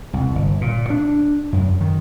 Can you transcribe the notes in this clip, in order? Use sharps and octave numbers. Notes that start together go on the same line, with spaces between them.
C2
G1
A#2
D4
F#2
D#3